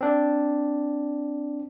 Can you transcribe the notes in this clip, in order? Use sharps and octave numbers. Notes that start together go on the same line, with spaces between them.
C4 D4